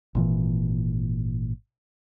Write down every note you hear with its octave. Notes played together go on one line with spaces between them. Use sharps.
G#1 A#2 E3